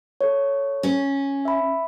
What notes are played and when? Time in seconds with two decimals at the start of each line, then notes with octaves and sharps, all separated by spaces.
0.21 A4 C#5
0.83 C#4
1.45 E5 B5